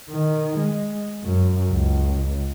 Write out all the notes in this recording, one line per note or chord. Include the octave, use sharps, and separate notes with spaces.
D#3
G#3
F#2
C#2